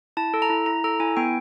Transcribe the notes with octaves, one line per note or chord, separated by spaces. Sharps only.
E4 A5
A4
A#5
E4
E4 A#5
A4 A#5
E4 G#5
B3 G5